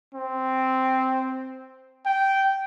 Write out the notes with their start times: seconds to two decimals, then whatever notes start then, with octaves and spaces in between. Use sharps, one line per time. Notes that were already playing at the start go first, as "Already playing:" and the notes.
0.14 C4
2.06 G5